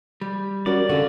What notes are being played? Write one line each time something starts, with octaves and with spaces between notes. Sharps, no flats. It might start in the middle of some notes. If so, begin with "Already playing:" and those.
G3
C#4 F#4 A#4 D5
D3 C#4 F4 F#4 A4